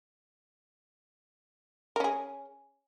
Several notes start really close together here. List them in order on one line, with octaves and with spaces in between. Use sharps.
A#4 C#4 G#4